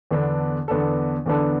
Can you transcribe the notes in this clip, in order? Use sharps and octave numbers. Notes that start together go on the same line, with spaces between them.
E2 D3 B3 D4 A4
E2 D3 B3 D4 A4
E2 D3 B3 D4 A4